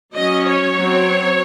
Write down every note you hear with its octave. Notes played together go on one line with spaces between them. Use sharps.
F#3 C#4 D#5
C#5
F#3 C4